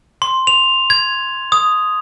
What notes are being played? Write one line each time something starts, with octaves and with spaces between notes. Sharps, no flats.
C6
F7
G#6
D#6